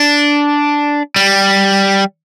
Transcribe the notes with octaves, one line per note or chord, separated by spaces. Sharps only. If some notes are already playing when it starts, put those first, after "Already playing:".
Already playing: D4
G3